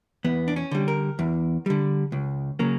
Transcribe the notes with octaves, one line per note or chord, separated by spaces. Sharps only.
E2 B3
D4
C#4
D3 G3
A#4
E2
D3 G3
C#2
C#3 F#3 A#3